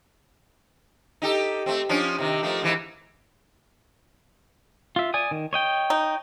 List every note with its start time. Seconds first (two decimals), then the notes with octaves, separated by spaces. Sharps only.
1.22 D#4 G4 A4
1.66 A3 C4
1.89 F3 C#4 D4
2.18 C3 D#3
2.43 F3 A3 A#3
2.62 G#2 E3 A#3
4.96 F4 E5
5.14 D5 G#5 D#6
5.31 D#3
5.53 C#5 D#5 G5
5.90 D#4